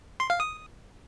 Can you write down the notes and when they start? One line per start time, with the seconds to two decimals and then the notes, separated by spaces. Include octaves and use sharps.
0.20 C6
0.30 F5
0.40 D#6